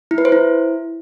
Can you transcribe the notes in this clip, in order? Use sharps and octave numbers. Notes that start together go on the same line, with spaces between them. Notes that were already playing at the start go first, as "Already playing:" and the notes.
E4
B4
C5
E4